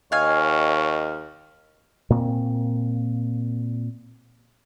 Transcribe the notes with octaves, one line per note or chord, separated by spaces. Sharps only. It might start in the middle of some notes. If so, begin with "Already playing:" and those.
D#2 C#5 D#5 F5 G#5 F6
A#2 A#3 C4